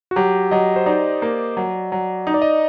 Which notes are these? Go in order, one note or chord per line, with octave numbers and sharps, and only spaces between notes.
F#4
F#3 G4
F#3 D#5
C5
D#4 D5
A#3
F#3
F#3
D#4 D#5
D5
D#5